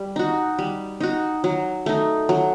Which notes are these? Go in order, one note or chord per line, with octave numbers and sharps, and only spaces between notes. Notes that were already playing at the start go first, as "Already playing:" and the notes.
Already playing: G3
D#4 F#4
G3
D#4 F#4
F#3
A3 D#4
F#3